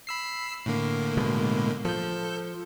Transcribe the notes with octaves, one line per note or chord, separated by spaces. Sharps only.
B5 E6 C7
A2 D3 A#3
B2 G#3
F3 A4 G6